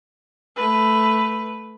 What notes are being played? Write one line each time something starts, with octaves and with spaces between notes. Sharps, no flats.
A3 B4